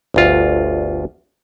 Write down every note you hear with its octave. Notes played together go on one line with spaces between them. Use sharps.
G1 D2 F4